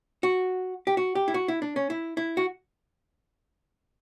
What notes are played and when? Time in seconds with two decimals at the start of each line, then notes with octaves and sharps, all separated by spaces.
0.23 F#4
0.87 G4
0.97 F#4
1.15 G4
1.28 E4
1.34 F#4
1.48 E4
1.62 D4
1.76 C#4
1.90 E4
2.17 E4
2.37 F#4